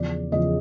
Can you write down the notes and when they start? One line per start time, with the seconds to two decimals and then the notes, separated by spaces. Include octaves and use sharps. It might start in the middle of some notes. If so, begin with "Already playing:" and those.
Already playing: E2 C#3 F3 D5
0.32 E2 C#3 F3 D#5